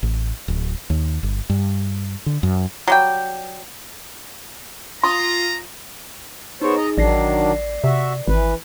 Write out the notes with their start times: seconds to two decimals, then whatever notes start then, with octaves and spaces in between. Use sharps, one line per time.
0.03 A1
0.48 D1
0.90 D#2
1.23 G1
1.50 G2
2.26 D3
2.43 F#2
2.88 F#3 G3 G5
5.04 F4 A#5 C6 D#6
6.61 B3 D#4 G#4 C5 C#5
6.76 D#5 A#5
6.98 A1 D#3 F#3 D4 D5 A#6 C7
7.84 C3 F#4 E5
8.27 G#1 E3 B4